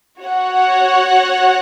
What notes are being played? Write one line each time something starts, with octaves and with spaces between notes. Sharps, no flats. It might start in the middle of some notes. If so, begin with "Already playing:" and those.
F#4 C#5 F#5